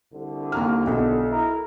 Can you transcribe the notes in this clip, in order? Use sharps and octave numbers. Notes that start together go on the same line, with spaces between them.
C2 D3
D#2 A#5 F6
B1
E4 A#4